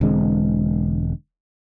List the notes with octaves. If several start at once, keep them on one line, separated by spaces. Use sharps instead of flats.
E1 D3 G#3 C4